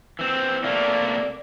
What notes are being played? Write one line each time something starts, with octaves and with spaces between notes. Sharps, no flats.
E3 C4
C3 A3 A#3 D5